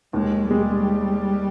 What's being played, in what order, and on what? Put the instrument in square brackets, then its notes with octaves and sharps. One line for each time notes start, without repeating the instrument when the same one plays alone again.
[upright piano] D#2 [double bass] G#3
[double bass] G3 [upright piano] G#3